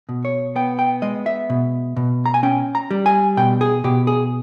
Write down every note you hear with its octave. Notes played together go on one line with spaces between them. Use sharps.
B2
C#5
B3 G5
G5
G#3 D#5
E5
B2
B2
A#5
G#5
C#4 G5
A#5
G3
G#5
B2 G5
G#4
B2 G4
G#4